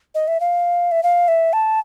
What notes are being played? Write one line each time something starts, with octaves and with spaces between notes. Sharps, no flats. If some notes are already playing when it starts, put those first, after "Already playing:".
D#5
E5
F5
E5
F5
E5
A5